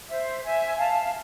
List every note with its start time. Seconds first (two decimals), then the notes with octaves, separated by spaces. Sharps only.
0.10 C5 E5
0.44 E5 G#5
0.78 F5 A5